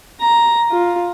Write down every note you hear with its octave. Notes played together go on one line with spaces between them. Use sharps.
A#5
F4